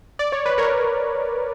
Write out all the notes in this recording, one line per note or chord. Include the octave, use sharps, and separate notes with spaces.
D5
C#5
B4
A#4 C#5